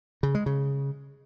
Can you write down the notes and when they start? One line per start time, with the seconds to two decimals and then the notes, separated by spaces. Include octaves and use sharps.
0.23 C#3
0.35 G#3
0.46 C#3